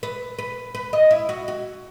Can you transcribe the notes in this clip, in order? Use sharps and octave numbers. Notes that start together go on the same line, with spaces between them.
B4
B4
B4
D#5
E4
F#4
F#4